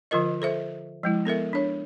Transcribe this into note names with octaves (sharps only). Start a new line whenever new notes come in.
D3 F3 F4 A#4 D#5
A4 C5 E5
F3 G#3 E4
B3 A4 A#4 E5
D4 C#5